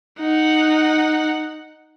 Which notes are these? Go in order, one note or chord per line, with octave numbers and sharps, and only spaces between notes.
D#4 F#5